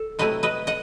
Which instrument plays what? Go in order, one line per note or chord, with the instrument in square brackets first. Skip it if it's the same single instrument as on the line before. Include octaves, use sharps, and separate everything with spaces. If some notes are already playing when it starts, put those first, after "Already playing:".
Already playing: [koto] A4
C3 F#3 A3 E4 B4 D#5
B4 D#5
D#5 F#5